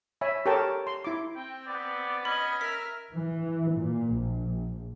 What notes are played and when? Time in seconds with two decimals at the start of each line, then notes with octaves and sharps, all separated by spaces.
0.21 C#5 E5 G#5 B5
0.46 G4 A4 A#4 C#5 G5 A5
0.87 C6
1.04 E4 D6
1.36 C4 G5
1.67 B3 D5
2.25 C#4 D#5 B5
2.61 A#4 E5 B6
3.14 E3
3.76 A#2
4.15 A#1